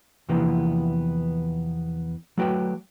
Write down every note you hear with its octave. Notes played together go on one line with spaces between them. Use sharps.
E2 C3 E3 F3 A#3 B3
F#3 A3 F#4 B4 G5